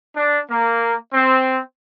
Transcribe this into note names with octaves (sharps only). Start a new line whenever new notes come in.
D4
A#3
C4